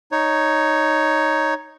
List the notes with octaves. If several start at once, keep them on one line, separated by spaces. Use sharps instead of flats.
D#4 C#5